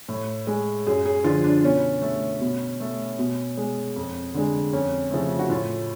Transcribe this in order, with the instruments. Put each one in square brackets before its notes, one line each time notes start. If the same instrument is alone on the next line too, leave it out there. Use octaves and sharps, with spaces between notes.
[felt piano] A2
G#3
F#2 G#4
G#4
D3 F3 F4
D4
B2 C#4
A3
B2
A3
B2
G#3
F2
D3 G#3
F2 C#4
C#3 F3 A3
F#4
A2 F4